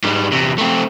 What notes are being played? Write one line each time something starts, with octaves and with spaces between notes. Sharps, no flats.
G#2 G3
E2 C3
A3 C4